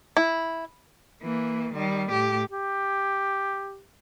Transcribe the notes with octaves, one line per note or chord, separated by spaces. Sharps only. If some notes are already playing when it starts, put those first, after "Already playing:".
E4
E3 A#3
D#3 G3
A2 G4
G4